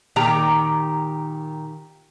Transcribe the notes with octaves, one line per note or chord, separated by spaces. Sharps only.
A#2 D#3 G4 A#5